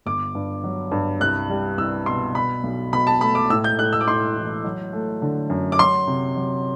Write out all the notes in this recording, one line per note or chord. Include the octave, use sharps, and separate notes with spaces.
G1 D6
G2
F#3
G2
C2 F#6
G3
C2 E6
B2 C6
B2 B5
B1
B2 B5
A5
A3 B5
D6
A2 E6
G6
A2 F#6
E6
D6
A2 C6
E3
F#3
A3
D3
F#2
D6
F#3 C6
C3
F#3